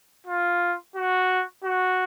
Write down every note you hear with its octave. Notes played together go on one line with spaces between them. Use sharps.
F4
F#4
F#4